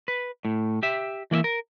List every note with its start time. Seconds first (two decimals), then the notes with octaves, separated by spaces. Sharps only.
0.08 B4
0.45 A2
0.83 G4 E5
1.31 E3 A#3 D5 E5
1.44 A#4